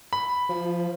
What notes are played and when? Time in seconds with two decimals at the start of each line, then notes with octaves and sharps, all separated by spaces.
0.13 B5
0.49 F3